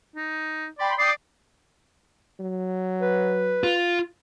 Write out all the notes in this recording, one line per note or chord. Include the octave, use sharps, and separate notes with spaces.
D#4
D5 G5 B5 C6
D5 G5 D6 D#6 C7
F#3
B4
F4